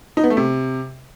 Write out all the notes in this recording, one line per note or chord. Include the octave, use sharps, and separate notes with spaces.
D#4
B3
A3
C3